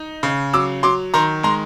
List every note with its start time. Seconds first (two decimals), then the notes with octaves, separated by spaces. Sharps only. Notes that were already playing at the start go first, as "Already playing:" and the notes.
Already playing: D#4
0.23 C#3
0.53 F#3 D6 E6
0.83 F#3 C6 D6
1.14 D#3 A#5 C6
1.43 G#3 A#5 C6